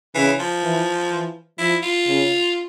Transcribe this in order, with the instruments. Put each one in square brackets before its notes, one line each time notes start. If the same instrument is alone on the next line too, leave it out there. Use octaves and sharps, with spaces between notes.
[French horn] C#3 [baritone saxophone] E3
[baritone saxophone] F3
[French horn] E3
E3
[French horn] F3 [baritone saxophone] E4
[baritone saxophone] F4
[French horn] C#3